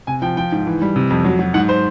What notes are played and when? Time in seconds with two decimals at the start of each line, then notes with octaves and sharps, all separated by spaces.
0.07 C3 G#5
0.22 F3 G5
0.37 F3 G5
0.52 G#2
0.67 E3
0.82 G3
0.96 C3
1.10 F2
1.25 F#3
1.39 F#3
1.54 G#2 F#5
1.69 C5